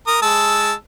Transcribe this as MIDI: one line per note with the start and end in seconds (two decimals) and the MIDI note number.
0.07 0.21 70
0.07 0.21 87
0.22 0.73 56
0.22 0.73 81
0.22 0.73 88